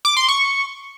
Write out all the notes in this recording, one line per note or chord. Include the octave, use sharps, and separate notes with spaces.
D6
C6
C#6